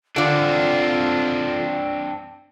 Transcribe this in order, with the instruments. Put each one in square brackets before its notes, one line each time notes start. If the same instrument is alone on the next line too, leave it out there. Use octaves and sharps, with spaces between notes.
[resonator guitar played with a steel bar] D3 D5 [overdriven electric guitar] C4 D4 [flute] F4